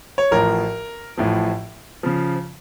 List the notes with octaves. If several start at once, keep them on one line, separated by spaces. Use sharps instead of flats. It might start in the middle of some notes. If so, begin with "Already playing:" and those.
C#5
A1 A2 F3 A#4
A1 A2 F3
C#3 F3